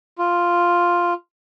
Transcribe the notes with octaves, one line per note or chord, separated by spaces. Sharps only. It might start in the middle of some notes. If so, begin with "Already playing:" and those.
F4